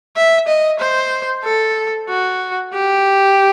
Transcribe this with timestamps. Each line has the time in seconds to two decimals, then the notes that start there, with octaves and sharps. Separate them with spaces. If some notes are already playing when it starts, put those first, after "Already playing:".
0.16 E5
0.48 D#5
0.80 C5
1.44 A4
2.09 F#4
2.73 G4